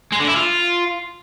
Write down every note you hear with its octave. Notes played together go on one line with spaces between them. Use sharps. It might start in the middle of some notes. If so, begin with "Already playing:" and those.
G#3
D3
E4
F4